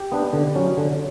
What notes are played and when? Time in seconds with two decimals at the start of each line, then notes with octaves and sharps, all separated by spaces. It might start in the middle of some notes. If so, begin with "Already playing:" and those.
Already playing: G4
0.12 B3 D4
0.33 D3
0.56 F#3 C#4
0.77 D3